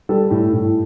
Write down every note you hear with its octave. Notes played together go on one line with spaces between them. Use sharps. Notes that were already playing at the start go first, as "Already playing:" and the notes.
G3 A4
A2
A2